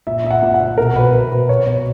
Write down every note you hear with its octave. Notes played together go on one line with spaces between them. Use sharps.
A#2 E5
A#2 E5
F#5
A#2
F#5
A#2
B2 A#4
B2 B4
B2 B4
B2 B4
B2 C#5
B2 C#5